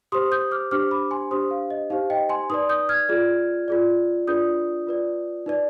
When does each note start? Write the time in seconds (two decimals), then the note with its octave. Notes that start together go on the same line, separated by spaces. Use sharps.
0.12 G4 C5 C6 D#6
0.31 D#6 G6
0.51 D6 F6
0.71 D4 G4 C5 D6 F6
0.91 B5 D6
1.11 G#5 C6
1.31 D4 G4 C5 C6 D#6
1.51 F5
1.70 D#5
1.90 D#4 G4 C5 F5
2.10 D#5 G5
2.29 G#5 C6
2.50 D#4 B4 D5 C6 D#6
2.69 D#6 G6
2.89 F6 G#6
3.09 F4 G#4 D5
3.68 F4 G#4 D5
4.27 D4 F4 G#4 B4 D5 D#6 G6
4.87 F4 B4 D5
5.46 D#4 B4 D5